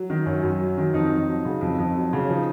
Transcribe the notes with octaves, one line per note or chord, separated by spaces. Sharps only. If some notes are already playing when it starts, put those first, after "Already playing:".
Already playing: F#3
D#3
F#2 C#4
F#2
F#3
D#3
F2 D#4
F2
F#3
C#3
F2
F2
F#3
C#3
C#4
F3 D#4